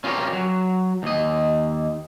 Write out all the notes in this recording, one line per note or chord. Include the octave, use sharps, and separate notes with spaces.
C#4 F4 G4 G#4 A#4 C#5
F#3
D#2 D#5